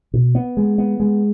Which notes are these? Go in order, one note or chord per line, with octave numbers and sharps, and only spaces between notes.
B2
B3
G#3
B3
G#3